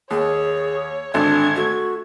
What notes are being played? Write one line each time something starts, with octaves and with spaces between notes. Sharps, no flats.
D#2 G#4 C#5
G#1 D3 D4 G#6
A3 F#4